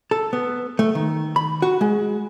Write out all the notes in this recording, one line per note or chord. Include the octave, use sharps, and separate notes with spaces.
A4
B3
A3
D#3
B5
F#4
G#3